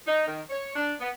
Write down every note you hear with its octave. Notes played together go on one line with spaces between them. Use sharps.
D#4
D#3
C#5
D4
B3